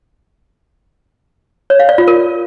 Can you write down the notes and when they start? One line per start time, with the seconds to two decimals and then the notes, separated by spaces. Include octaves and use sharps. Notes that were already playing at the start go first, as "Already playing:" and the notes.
1.70 C#5
1.79 F5
1.89 D5
1.98 F4
2.08 A#4